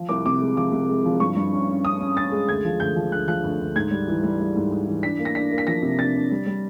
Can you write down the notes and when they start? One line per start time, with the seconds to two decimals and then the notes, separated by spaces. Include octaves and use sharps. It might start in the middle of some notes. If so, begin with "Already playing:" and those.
Already playing: F3
0.09 C2 D6
0.26 C3 D6
0.41 G#3
0.56 F3 D6
0.72 C3
0.89 G#3
1.05 F3
1.20 G2 C#6
1.36 G2
1.53 C#4
1.68 C#4
1.84 C#4 D#6
2.01 C#4
2.17 C#4 A6
2.32 G#3
2.48 D2 G#6
2.65 F3
2.80 D2 G6
2.96 F3
3.12 D2 F#6
3.28 F3 F#6
3.44 D2
3.60 D2
3.75 G#2 G#6
3.91 G3
4.08 E3
4.23 G3
4.39 G3
4.56 G#2
4.71 G#2
4.87 E3
5.03 D4 B6
5.19 A#3
5.25 A#6
5.35 D4 B6
5.51 A#3
5.58 B6
5.67 F3 A#6
5.82 C3
5.99 D4 A6
6.15 D4
6.31 G3
6.46 G3